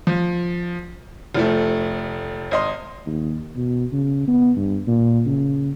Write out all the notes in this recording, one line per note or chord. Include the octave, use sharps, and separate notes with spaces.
F3
F1 F3 A3
G#1 D#5 C6
D#2
B2
C#3
B3
G2
A#2
C#3